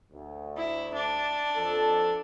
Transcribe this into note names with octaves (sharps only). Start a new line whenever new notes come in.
D2
E4
D4
F2 A4